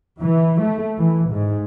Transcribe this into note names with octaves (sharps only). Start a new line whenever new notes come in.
E3
A3
E3
G#2